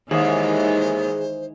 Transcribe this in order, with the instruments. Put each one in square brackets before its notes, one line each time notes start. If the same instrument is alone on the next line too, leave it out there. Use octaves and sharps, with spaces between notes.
[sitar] D#2 [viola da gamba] D#3 E3 G#3 [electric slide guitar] G#4 E5 [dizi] C5